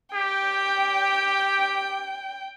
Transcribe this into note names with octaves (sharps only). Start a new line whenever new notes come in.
G4 G5